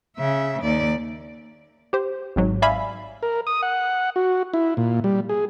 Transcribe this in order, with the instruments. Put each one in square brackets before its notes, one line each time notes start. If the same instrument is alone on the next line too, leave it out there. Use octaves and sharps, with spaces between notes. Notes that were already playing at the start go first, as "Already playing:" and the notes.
[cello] C#3 E5
D#2 D5
[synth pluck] G4 C5
G#1 G#2 F#3
D5 E5 F5 G#5 B5
[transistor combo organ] A#4
D#6
F#5
F#4
E4
A#2
G3
G#4